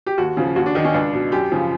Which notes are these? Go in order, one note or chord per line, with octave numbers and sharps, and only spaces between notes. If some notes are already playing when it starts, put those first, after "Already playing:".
G4
D#2 F#4
C#3 F3
D#2 F#4
D4
D#3 D#4
C#4
C#2 D4
B2
F#2 G4
C#3 F3